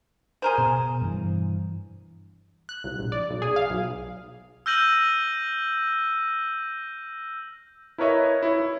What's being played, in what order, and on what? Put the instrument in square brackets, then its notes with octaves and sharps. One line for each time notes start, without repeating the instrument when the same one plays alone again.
[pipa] G#4 A#4 C5
[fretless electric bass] B2
G2 E3
[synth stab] F#6
C2
A#1
D5
B1
G#4
F5
B1
[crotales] E6 F6 G6 A#6 D#7 F#7
[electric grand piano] E4 A#4 B4 C#5 D#5 E5
E4 C#5
E4